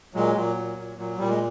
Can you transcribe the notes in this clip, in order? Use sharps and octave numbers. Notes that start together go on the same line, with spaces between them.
A#2 F#3 G#3
A#2 F#3
A#2
A#2
A#2 F#3
A#2 G3
G#3